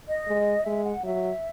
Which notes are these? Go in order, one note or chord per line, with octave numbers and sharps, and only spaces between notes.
D#5
G#3
G#3 E5
F#5
F#3 E5